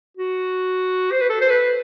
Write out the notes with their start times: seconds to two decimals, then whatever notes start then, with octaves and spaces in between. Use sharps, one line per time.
0.17 F#4
1.11 C5
1.21 B4
1.30 A4
1.41 C5
1.50 B4